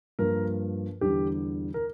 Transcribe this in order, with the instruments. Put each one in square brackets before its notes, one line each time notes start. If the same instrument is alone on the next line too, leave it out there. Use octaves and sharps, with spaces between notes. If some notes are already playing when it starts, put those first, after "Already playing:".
[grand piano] G2 F3 A#3 A#4
E2 D3 G3 D4 G4
A#4